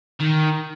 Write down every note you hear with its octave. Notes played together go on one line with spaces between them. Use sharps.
D#3